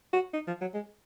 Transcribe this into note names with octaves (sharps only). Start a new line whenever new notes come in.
F#4
D#4
F3
F#3
G#3